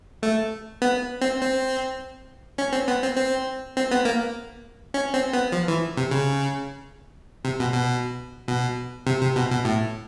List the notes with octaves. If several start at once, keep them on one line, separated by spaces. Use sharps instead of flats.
A3
B3
C4
C4
C#4
C4
B3
C4
C4
C4
B3
A#3
C#4
C4
B3
F3
E3
C3
C#3
C3
B2
B2
B2
C3
C3
B2
B2
A2